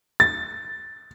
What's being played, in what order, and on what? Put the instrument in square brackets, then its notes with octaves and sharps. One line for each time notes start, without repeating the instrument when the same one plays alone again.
[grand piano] A6